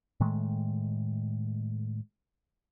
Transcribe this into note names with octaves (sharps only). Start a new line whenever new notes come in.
A2 D#3 G#3 A3